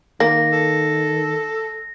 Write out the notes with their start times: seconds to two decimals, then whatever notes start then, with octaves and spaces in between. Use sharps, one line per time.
0.20 D#3 A#3 A#6
0.52 A4